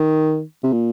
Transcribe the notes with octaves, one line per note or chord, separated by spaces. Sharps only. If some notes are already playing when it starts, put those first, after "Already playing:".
Already playing: D#3
C3
A#2